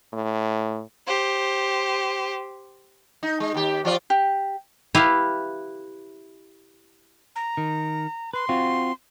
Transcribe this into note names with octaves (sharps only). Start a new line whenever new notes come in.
A2
G4 C5
D#4
G#3
D#2 G4
F3 F4 D5
G4
E4 G4 B4 F5
A#5
D#3
B4 C6
C4 F4 F#4